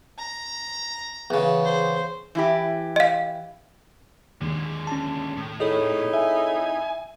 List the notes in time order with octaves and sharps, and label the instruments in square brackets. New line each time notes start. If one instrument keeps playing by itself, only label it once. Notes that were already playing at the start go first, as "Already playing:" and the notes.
[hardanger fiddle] A#5
[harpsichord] E2 C#3
[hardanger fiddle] C5
[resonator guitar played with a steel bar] E3 E4 G4
[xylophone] D#5 F5
[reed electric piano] D#2 [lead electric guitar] D3 G#3
[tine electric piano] C#4 A5
[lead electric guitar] A2
[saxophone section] F2 D#4 E4 [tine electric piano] G#4 A4 C#5
[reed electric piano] E5 [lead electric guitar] G#5